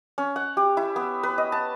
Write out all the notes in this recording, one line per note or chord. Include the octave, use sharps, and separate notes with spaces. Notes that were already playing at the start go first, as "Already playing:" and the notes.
C#4
F#5
G4
E4
B3
B4
D#5
A5